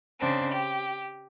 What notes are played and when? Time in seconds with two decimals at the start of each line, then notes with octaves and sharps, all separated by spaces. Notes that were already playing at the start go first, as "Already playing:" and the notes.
0.19 C#3 C4 D4
0.51 G4